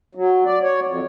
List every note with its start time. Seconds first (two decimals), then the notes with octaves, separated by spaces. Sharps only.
0.15 F#3
0.46 D5
0.63 C#5
0.86 F2